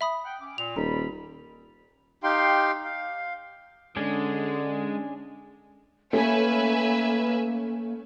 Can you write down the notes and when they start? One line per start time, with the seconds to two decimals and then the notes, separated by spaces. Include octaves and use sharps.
0.01 E5 B5 D#6
0.25 F#5 G5
0.40 C#4 D6
0.58 A#2 F7
0.76 D#1 G3 A#5 B5
2.23 D#4 G4 F5 G5 C6
2.84 F5
3.97 D3 G#3 C#4 D4
6.13 A3 A#3 C#4 B4 E5 G#5